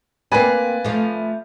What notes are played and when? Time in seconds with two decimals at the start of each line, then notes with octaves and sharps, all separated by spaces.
0.32 A#3 C4 B4 D5 G#5
0.84 F3 A3